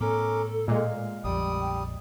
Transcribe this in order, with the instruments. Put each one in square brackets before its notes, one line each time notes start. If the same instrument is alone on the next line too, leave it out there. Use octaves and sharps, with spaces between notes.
[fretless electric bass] A2 B3 [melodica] C#4 A#4 D6 [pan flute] A4
[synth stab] A#2 G#3 [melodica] F5
[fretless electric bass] A#1 F2 [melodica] G3 D#6 [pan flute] G5